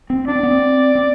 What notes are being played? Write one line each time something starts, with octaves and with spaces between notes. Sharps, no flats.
C4
D4 D5
C4
B3
C4
C4